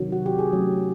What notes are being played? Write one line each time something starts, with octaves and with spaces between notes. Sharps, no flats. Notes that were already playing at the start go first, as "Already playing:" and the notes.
Already playing: C3 D#3 F#3
F#4
G4
G#4
F#3 A3 C#4